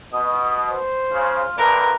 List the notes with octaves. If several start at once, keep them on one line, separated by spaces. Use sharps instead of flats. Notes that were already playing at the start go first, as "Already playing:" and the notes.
B2 D#5
C5
C#3 F4
A#1 G2 D3 A#4 B4